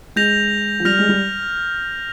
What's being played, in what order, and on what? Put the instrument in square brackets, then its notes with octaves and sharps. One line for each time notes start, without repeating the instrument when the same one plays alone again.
[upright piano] G#3 [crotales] G6 A#6 F7
[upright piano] F3
[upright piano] G3 [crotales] F6 A#6 F7
[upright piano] G#3
G3